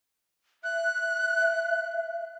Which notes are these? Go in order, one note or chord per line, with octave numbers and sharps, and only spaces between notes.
E5 F#6